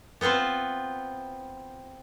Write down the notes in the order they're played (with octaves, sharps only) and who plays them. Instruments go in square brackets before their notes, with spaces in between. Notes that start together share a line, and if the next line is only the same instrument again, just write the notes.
[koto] B3 C4 F4 B4 C5